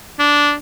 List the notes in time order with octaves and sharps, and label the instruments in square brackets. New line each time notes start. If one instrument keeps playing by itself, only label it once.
[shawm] D4